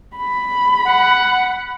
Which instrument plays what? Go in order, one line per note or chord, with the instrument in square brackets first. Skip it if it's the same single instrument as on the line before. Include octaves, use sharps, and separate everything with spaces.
[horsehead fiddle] B5
[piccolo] F#5